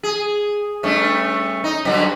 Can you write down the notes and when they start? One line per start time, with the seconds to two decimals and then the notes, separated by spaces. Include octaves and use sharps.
0.03 G#4
0.83 G2 A3 C#4
1.64 D#4
1.85 G2 D3 F#3